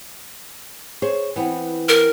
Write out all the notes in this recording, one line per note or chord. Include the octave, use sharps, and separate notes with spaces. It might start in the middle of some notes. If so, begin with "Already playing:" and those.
G#4 C5 C#5
E3 B3 C4
A#4